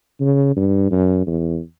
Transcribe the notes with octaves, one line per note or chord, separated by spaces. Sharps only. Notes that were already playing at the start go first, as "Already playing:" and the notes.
C#3
G2
F#2
E2